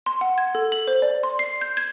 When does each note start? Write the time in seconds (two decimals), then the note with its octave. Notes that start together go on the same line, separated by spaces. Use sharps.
0.06 C6
0.21 F#5
0.38 G#6
0.55 A4
0.72 F#7
0.88 C5
1.02 D5
1.23 C6
1.39 C7
1.61 G6
1.77 G#6